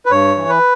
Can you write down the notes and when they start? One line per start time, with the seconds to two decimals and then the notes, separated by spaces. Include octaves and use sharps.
0.06 B4
0.11 G2 C#5
0.37 E3
0.49 B4